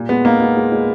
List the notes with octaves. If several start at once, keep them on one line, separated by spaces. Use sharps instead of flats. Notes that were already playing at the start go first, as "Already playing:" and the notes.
Already playing: A#2 G3
G#3 B3
A#3 D#4
G#3 B3
G#3
G#3